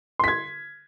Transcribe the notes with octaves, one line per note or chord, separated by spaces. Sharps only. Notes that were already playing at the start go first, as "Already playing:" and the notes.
C6 G#6 B6